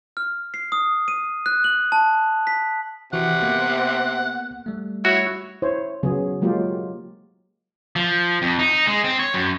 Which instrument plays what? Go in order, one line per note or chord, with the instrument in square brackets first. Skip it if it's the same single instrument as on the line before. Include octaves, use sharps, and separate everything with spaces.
[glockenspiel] F6
C7
D#6
D#7
F#6
F#7
A5
B6
[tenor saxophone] C3 [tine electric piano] E3 F#4 [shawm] F#5
[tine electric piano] A#3 B3
G3 A3
[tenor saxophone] E4 [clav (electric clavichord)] F#4 [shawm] C#5
[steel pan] E4 C5 C#5
C#3 F#3 B3 G#4
F#3 G#3 A#3 F4 G4
[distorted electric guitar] F3
F2
D#4
G#3
C4
C#5
F#2